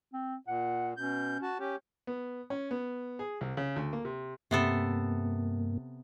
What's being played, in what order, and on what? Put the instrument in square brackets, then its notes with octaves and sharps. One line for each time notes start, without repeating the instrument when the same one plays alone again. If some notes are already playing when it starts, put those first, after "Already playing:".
[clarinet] C4
[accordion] A#2 [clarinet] F#5
[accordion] B2 G6 [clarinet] C#4
[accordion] F#4 A5
C#4 G4
[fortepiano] B3
C#4
B3
G#4
C2
C#3
D2
A#3
C3
[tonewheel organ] G2 A#3 [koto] C3 B3 A4